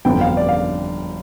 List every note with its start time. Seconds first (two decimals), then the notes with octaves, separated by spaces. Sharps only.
0.05 G1 F2 D3 G5
0.16 G5
0.21 F5
0.37 D5
0.49 F5